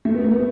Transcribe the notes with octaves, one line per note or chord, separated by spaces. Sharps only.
A3
B3
A3
B3